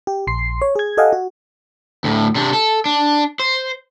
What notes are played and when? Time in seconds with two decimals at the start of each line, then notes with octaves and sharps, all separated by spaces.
0.07 G4
0.27 A#1 C6 C7
0.62 C#5
0.76 G#4 G#6
0.97 G4 A4 D#5 F5 F#5 G#5
1.13 F#4
2.04 D2 A2
2.35 C3 D4
2.53 A4
2.86 D4
3.39 C5